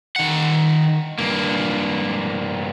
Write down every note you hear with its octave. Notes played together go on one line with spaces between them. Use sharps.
D#3 F#5
G2 A#3